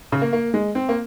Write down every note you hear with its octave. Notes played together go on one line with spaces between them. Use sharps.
C#3
A#3
A#3
G#3
C4
A#3